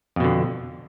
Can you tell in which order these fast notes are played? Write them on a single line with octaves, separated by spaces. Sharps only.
F2 B2 D3